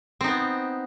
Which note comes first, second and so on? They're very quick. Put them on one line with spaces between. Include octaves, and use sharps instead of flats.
C4 D#4 B3